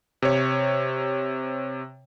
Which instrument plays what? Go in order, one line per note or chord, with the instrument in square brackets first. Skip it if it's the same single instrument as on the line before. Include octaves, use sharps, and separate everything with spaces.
[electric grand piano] C3 C#5